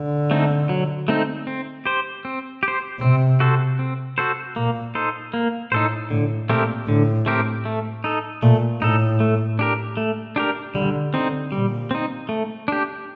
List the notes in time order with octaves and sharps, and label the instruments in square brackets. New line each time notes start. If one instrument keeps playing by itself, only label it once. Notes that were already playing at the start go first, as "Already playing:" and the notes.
Already playing: [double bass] D3
[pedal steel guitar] A3 C4 D#4
F#3
A3 C4 D#4
C4
G4 C5
C4
G4
C5
[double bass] C3 [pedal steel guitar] C4
[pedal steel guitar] F#4 A4 C5
C4
F#4 A4 C5
[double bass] A#2 [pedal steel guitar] A#3
[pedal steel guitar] D#4 A4 C5
A#3
[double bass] A2 [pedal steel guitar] D#4 A4 C5
[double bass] A2 [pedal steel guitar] D3
[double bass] A#2 [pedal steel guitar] A3 C4 G4 A#4
[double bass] A2 [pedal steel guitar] D3
[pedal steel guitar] A3 C4 G4 A#4
A3
D#4 A4
[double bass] A#2 [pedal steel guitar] A3
[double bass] A2 [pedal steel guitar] D#4 A4
[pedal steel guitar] A3
D4 G4 A#4
A3
D4 G4 A#4
[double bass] D3 [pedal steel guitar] G3
[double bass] D3 [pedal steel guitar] C4 D#4
[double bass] A#2 [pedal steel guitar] G3
[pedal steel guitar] C4 D#4
A3
D4 G4